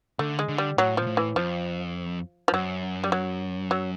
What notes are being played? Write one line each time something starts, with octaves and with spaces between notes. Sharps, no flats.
D3 A3
G#3
D3
G3
A2 F#3
A#2 F3
A2
E3
F2 F3
F3
F#2 F#3
G3
F#3
F#3